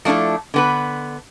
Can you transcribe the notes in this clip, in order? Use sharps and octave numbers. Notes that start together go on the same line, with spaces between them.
F3 A3 D4 E4 A4
D3 B3 B4